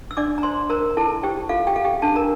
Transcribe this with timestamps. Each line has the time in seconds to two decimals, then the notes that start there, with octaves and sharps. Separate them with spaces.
0.11 E6
0.17 D4 D5 D6
0.38 A#5
0.43 C5 C6
0.70 A#4 C5 A#5
0.91 A#5
0.97 E4 A4 A5
1.23 G4 C5 G5
1.49 F4 A4 F5
1.67 G4 G5
1.76 A4 F5
1.85 G4 G5
2.02 D4 A4 A5
2.16 A#4 A#5